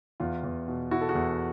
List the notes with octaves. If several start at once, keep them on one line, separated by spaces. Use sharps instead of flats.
E2 F4
E2
B2
B2 E4 F#4
A4
F#4 G#4
E2